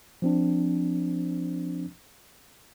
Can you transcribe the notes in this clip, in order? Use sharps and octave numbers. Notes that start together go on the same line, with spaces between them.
F3 C4 D4